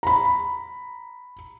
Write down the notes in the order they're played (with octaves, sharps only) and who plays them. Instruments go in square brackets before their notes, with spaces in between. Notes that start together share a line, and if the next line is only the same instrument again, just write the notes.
[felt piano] A#5 B5